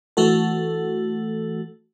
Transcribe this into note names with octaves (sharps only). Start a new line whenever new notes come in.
E3 A3 F#4 A4